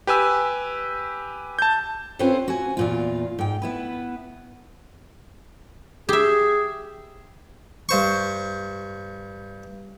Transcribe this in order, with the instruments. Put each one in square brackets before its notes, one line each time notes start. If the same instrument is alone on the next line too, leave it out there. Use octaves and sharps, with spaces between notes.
[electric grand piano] G4 B4 G#5 E6
A5 G6
[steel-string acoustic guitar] C4 C#4 F4 A4 B4 C5
F#4 G#5
E2 A#2 F4
G#2 G5
B3 E4 B4
[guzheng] G4 E5 [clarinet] G#4
[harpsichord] G2 C5 C#6